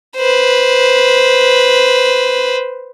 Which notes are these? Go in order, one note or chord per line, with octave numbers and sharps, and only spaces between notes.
B4 C5